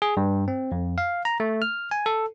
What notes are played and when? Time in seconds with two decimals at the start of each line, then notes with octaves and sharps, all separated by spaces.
0.02 G#4
0.17 G2
0.48 C4
0.72 F2
0.98 F5
1.25 A#5
1.40 A3
1.62 F6
1.91 G#5
2.06 A4